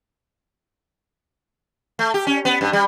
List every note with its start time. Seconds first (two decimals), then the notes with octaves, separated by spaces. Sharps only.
1.99 A3
2.14 G4
2.27 C#4
2.45 B3
2.61 G2
2.73 G3